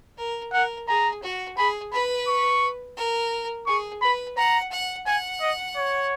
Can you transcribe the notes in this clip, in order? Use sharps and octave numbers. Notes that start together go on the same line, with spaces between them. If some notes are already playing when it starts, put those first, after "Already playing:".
A#4
A#4 F#5
G#4 A#5
F#4
G#4 B5
B4 B5
C#6
A#4
G#4 C#6
B4 B5
F#5 A#5
F#5
F#5 G#5
D#5
C#5